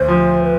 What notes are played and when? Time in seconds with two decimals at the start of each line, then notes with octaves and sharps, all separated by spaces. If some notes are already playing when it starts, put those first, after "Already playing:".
Already playing: D2 C5
0.08 F3
0.44 B4